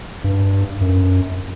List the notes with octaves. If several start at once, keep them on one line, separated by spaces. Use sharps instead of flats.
G2
F#2